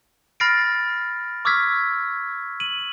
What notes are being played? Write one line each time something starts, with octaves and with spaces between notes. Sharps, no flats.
B5 F6 A6 A#6 C7 D7
C#6 D6 E6 F6 G#6 B6
D#7 F#7